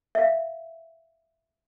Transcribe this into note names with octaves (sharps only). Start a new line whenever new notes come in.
E5 F5